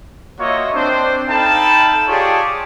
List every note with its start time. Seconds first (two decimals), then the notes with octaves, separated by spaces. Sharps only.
0.39 A#3 F4 F#4 C#5 D#5 E5
0.74 C4 D4 C5
1.28 D#4 A4 F5 G5 A5 B5
2.08 F4 G4 G#4 C#5 D5 A5